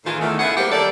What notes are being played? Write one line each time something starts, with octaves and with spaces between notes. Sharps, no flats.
A2 D#3 E3 F4 G#4
E2 D#3 A3
C#3 B3 E4 G#4 E5 F#5
F#3 G3 A#3 G4 C5 F#5
D#3 G3 A#3 A4 D5